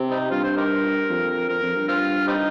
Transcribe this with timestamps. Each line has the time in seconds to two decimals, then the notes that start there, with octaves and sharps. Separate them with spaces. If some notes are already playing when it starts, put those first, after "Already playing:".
Already playing: C3
0.10 G3 C4 D#4
0.31 G2 F4
0.43 C5
0.57 D#4 G4 A#4
1.10 F2
1.48 F2 A#4
1.62 F2
1.75 G2
1.88 C4 F4
2.27 G3 C4 D#4